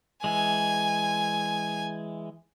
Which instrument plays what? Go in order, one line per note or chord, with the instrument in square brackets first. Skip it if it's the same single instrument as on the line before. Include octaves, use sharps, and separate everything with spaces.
[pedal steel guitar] E3 G#3 [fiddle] G#5